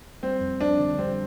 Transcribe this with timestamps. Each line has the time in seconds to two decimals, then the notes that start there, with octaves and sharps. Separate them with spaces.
0.23 G3 C4
0.41 F2
0.60 F2 D4
0.79 D3
0.98 G3 C4